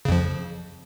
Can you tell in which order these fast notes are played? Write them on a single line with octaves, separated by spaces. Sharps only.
C#3 F2 F3